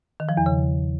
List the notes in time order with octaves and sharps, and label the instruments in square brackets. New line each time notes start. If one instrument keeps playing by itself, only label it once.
[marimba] D#3
F3
E2
C#3